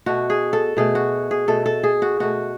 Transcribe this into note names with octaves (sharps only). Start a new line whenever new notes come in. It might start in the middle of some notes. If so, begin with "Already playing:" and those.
B2 A3 F#4
G#4
A4
B2 A3 G#4
F#4
G#4
B2 A3 A4
A4
G#4
F#4
B2 A3 F#4